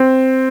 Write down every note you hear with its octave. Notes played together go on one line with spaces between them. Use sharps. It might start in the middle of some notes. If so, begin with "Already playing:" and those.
Already playing: C4